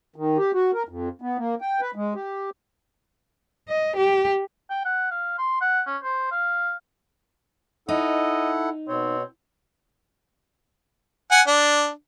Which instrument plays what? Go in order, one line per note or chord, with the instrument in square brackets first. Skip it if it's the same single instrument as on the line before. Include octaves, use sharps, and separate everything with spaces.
[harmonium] D#3
G4
F#4
A#4
F2
B3
A#3
G5
B4
G#3
G4
[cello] D#5
G4
[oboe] G5
F#5
F5
C6
F#5
C#4
C5
F5
[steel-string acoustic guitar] D#4 [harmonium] E4 A4 F#5 [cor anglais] D#5
[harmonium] B2 C#5 [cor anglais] C4
[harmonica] F#5 G#5
D4